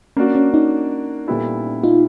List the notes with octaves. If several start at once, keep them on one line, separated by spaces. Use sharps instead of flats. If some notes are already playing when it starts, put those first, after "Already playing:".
A#3 C#4 D4 F#4
C#4
C#4 D#4
A#2 G3 B3 E4 A4
D#4 F4